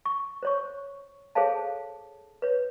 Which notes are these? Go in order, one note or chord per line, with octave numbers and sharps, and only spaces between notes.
C#6
C5 C#5 C#6
G#4 A4 C5 C#5 F5 A5
B4 C#5